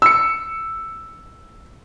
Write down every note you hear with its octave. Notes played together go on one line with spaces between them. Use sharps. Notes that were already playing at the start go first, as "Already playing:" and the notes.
E6 C#7